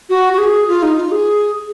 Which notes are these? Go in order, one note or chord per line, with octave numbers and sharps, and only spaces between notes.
F#4
F#4
G#4
F4
D#4
F4
G#4